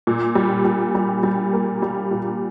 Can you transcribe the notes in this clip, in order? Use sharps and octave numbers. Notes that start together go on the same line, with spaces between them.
A#2
G3
A#2
G3
G3
A#3
G3
A#2